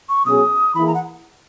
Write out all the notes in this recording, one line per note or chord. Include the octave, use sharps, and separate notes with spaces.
C#6
B2 F#3 C#4 G#4 D#6
E3 A#3 E4 G#4 B5
A#5
F#5